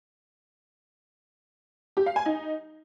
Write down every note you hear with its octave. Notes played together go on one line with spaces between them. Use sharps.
G4
F5
G#5
D#4